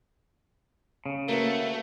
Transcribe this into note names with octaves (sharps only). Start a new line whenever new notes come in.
C#3
A3 A#3 F#4 B4